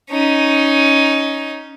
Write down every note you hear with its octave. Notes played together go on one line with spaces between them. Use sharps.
C#4 D#4